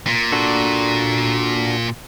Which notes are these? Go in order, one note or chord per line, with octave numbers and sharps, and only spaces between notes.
A#2
D4 F#4 A4